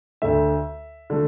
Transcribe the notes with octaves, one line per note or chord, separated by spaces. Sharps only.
D2 D3 A3 E5
D3 A3